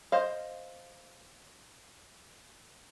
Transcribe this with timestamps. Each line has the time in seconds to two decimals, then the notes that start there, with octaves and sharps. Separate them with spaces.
0.12 C5 D#5 F5